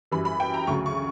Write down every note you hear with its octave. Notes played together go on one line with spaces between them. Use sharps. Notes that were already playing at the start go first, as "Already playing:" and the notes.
F#2 E3 G3 B5
B5
G5
A#5
D2 C#3 F#3 C#6
C#6